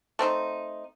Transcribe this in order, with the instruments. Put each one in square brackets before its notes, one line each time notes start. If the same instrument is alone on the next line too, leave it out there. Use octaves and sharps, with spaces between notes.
[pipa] A3 C4 D#4